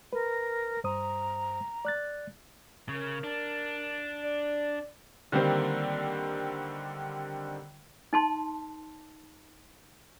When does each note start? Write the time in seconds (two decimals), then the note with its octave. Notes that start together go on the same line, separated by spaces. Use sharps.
0.13 A#4 B4
0.84 G2 C5 A#5 D#6
1.85 D5 F#6 A6
2.89 C#3 A#4
3.24 D4
4.23 D5
5.32 D3 D#3 G3 A#3 C4
8.13 D#4 A5 C6